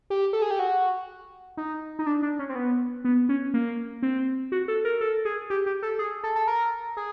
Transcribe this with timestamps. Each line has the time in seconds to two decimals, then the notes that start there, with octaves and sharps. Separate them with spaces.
0.10 G4
0.33 A4
0.42 G#4
0.51 G4
0.59 F#4
1.57 D#4
1.99 D#4
2.06 D4
2.22 D4
2.39 C#4
2.49 C4
2.55 B3
3.04 B3
3.29 C#4
3.54 A#3
4.02 C4
4.52 F#4
4.68 A4
4.85 A#4
5.01 A4
5.25 G#4
5.50 G4
5.66 G4
5.83 A4
5.99 G#4
6.23 A4
6.36 A4
6.47 A#4
6.97 G#4